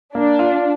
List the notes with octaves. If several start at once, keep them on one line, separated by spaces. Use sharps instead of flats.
A#3 D4
F4